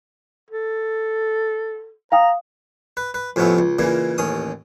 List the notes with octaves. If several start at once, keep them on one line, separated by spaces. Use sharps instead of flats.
A4
F5 G5 A#5 D#6
B4
B4
F2 A2 C3 A3 B3 C#4
C#2
A#2 C#3 E3 A#3
A1 D#2 C#4 D#6